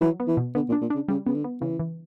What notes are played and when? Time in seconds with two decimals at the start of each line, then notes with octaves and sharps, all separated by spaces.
0.01 E3 F#3
0.20 B3
0.28 E3
0.37 B2
0.55 D3 B3
0.69 A#2
0.72 D4
0.82 A#2
0.90 C#3 D4
1.08 C#3 G3
1.26 C#3 B3
1.35 D3
1.44 B3
1.61 C#3 E3
1.80 E3